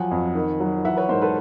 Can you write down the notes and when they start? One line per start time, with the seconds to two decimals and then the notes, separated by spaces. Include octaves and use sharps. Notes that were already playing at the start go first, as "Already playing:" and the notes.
Already playing: F3 F#3 F#5 G#5
0.11 F2
0.35 D#3
0.60 F#3
0.85 E3 E5 F#5
0.97 B4 C#5
1.09 G#2 A#4 C5
1.21 A4 B4